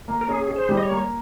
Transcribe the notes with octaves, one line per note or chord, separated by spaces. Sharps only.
A#3
A#4
C#4 G#4
G#4
C5
G3
D#5
C#5
A#3